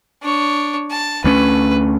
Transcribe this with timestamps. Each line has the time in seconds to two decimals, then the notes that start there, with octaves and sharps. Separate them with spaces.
0.23 D4 C#5
0.90 A5
1.24 D2 A3 C#4 B4